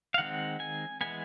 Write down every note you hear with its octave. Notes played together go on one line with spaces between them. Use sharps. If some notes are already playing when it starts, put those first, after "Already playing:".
F5
D#3 G#3 C4 F#5
G#5
E3 G#3 B3 G#5